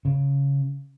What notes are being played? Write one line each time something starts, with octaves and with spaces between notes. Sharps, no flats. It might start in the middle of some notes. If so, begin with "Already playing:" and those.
C#3